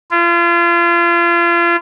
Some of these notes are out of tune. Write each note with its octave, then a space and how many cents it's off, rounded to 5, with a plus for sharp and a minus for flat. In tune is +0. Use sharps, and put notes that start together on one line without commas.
F4 -35